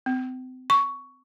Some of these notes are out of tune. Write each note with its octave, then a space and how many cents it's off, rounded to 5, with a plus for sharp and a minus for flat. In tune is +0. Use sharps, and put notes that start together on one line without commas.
C4 -35
C#6 +10